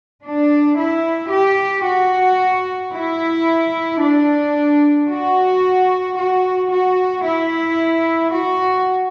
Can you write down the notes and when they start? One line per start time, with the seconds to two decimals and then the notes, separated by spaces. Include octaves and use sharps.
0.22 D4
0.76 E4
1.30 G4
1.84 F#4
2.92 E4
4.01 D4
5.08 F#4
6.16 F#4
6.70 F#4
7.24 E4
8.33 F#4